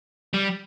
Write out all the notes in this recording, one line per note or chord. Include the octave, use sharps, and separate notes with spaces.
G3